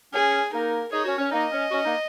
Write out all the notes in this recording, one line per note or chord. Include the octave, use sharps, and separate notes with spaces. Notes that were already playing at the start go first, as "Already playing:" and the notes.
C#4 G#4
A#3 D#4 A#4
D#4 G#4 C#5
C#4 F#4
C#4
A#3 D#4 D#5
C#4
C#4 F#4
A#3 D#4